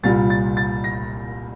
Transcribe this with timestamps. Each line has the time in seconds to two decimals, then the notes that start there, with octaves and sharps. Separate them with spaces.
0.03 C2 A#2 G3 A6
0.30 A6
0.57 A6
0.84 A#6